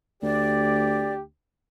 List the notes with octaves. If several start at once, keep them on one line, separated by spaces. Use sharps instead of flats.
D2 G4 D5